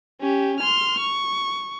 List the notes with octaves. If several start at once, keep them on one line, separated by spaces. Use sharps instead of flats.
C#4 G4
C6 F6
C#6